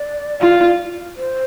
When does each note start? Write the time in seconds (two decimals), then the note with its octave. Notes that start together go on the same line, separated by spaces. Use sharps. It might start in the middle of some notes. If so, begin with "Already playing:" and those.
Already playing: D5
0.41 F4
1.17 C5